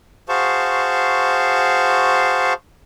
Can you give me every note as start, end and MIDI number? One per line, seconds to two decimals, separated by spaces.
0.29 2.53 66
0.29 2.53 68
0.29 2.53 72
0.29 2.53 77
0.29 2.53 81
0.29 2.53 85